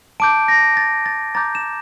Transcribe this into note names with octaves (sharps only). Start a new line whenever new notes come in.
A5 D6 G6 D7
A#6
A6
A6
A#5 D6 G6 A6
E7